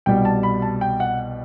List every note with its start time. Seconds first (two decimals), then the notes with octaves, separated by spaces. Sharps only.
0.06 C2 B2 G3 G5
0.25 A5
0.43 B5
0.62 A5
0.81 G5
1.00 F#5